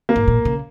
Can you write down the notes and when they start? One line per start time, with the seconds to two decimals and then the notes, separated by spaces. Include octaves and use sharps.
0.09 A#3
0.16 G#2
0.28 A#2
0.45 C#3